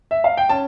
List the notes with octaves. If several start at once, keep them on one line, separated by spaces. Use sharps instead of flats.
E5
F5
G5
C#4 A5